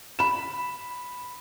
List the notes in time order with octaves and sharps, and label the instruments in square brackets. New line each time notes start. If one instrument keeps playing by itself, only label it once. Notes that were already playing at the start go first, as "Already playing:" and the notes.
[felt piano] B5 E7